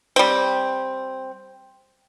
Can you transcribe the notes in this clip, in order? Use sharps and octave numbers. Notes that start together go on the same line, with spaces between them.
G3 C4